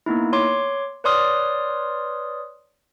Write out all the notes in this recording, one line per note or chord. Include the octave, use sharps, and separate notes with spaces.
A#3 B3 D#4 E4
C#5 C6 D6
B4 C#5 D5 C6 D#6 F6